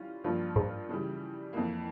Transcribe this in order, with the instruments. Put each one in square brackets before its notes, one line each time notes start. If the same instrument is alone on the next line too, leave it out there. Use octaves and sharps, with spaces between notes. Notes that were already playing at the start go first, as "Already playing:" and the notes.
Already playing: [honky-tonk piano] E3 G3 C#4 F4
G2 F3 A#3 F4
[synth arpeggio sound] G#2
[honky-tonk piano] C#3 E3 G3
F2 E3 A#3